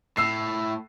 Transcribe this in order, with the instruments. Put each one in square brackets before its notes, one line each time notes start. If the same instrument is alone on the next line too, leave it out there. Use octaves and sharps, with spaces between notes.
[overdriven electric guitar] A2 [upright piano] E6 C7